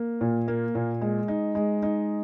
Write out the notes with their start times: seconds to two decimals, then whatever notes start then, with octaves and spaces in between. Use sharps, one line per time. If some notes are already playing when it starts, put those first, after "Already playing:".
Already playing: A#3
0.21 A#2
0.48 A#3
0.75 A#2
1.01 G#3
1.28 D#4
1.55 G#3
1.83 D#4